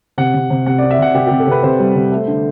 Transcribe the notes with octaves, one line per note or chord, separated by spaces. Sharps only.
C3 F#5
C3
C3
C3 F#5
C4 D5
E5
C3 F#5
C3 G4
C3 G4
A4
C3 B4
C3 C5
G3
C3
A3
D3